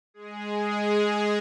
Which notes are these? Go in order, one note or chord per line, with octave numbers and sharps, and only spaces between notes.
G#3 G#4